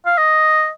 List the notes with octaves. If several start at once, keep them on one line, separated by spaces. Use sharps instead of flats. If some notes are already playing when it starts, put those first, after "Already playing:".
F5
D#5